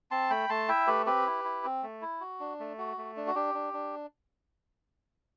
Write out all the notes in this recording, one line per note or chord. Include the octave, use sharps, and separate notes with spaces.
C4 A5 C6
A3 G5 B5
A3 A5 C6
E4 E5 G5
A3 G4 B4
C4 G4 B4
E4
E4
C4
A3
E4
F#4
D4
A3
F#4
A3
D4
F#4
D4 G4
D4
D4